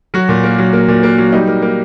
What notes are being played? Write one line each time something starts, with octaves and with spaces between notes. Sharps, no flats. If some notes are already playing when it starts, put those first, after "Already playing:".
F#3 F#4
A#2
A#3
F#3
A#3
A#2
A#3
F#3
G3 D#4
A#3
A#3